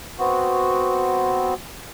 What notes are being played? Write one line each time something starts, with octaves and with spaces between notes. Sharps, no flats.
B3 C4 F#4